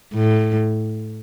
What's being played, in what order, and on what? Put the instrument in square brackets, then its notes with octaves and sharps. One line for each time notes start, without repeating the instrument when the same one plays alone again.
[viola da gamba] A2